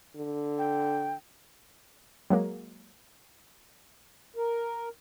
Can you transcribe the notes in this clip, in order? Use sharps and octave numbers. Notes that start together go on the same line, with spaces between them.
D3
G5
F#3 G#3 A#3
A#4